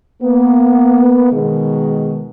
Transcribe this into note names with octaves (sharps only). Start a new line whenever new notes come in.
A#3 B3
B2 D#3 G#3